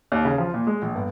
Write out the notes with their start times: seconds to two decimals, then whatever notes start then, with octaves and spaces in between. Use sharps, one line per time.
0.12 D#2
0.25 C#3
0.38 F3
0.54 A#2
0.67 G#3
0.82 A#1
0.95 G1